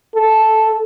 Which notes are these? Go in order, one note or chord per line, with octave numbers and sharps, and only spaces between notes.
A4